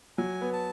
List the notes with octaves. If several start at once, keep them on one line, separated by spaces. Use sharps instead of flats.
F#3 G#5
B3
A5